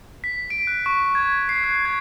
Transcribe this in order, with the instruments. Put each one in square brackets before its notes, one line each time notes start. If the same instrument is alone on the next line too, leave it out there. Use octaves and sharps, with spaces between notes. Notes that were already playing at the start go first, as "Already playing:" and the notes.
[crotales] B6
D7
F#6
C#6
G#6
C7
F#6
G#6